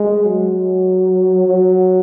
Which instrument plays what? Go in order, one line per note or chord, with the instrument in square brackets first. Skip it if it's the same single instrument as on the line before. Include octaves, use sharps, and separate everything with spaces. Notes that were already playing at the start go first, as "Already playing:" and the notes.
Already playing: [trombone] G#3
F#3
F#3